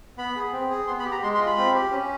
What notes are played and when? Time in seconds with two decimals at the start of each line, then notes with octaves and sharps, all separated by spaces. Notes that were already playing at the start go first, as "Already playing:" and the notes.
0.18 B3 B5
0.36 G#4
0.52 C4
0.70 G#4
0.87 B3 C6
0.99 B5
1.05 G4
1.12 A#5
1.23 G#3 C6
1.35 C6
1.40 F4
1.46 B5
1.58 C4
1.74 G4
1.92 C#4